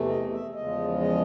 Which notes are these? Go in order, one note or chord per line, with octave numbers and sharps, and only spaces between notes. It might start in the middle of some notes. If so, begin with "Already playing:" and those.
Already playing: E2 C3 E3 A3
D#5
E5
E2 C#3 F3 G#3 D#5
D#5